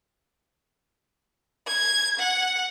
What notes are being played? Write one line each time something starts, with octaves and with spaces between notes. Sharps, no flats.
G#6
F#5